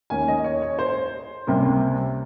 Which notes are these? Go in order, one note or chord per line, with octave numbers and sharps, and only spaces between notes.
D#2 D#3 A#3 C#4 G#5
D#5
C#5
C#5
C5
C#2 C3 G3 A#3